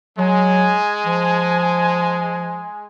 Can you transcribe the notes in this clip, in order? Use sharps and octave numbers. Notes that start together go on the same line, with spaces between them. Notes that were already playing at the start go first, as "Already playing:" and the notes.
F#3 G#3 G#5
F3